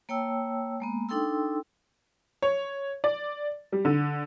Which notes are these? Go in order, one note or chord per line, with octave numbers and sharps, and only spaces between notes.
A#3 C#5 G5 A5 E6
G#3 A#3 B3
D4 D#4 A4 G5 C6 E6
C#5
D5
G3
D3